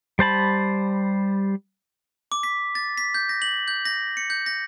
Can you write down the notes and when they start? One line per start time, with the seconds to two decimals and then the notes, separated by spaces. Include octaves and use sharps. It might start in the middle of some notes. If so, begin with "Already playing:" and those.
0.19 G3 C5 A5 B5
2.32 D6
2.43 B6
2.75 A6
2.98 B6
3.14 G6
3.29 A#6
3.42 F#7
3.68 G6
3.85 A#6
4.17 C#7
4.30 G6
4.46 A#6